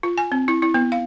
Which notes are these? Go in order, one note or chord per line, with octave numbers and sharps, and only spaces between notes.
F4
G#5
C4
E4
E4
B3
F5